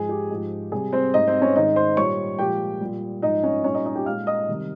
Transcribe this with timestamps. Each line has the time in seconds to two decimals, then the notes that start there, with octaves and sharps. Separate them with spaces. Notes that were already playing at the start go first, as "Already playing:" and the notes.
Already playing: G#2 F3 G#3 G#4
0.09 G4
0.30 G#2 F3 G#3
0.72 C3 G3 G#4
0.93 C4 C5
1.14 G#2 G3 D#4 D#5
1.28 C4 C5
1.42 C#4 C#5
1.56 G#2 D#3 G#3 D#4 D#5
1.76 C5 C6
1.97 A#2 G3 C#5 C#6
2.39 A#2 F3 G#3 G4 G5
2.81 A#2 G3
3.22 G#2 F3 G#3 D#4 D#5
3.43 C#4 C#5
3.64 A#2 G3 C#4 C#5
3.74 D#4 D#5
3.85 D#4 D#5
3.95 G4 G5
4.06 A#2 G#3 F5 F6
4.27 D#5 D#6
4.48 C3 D#3 G3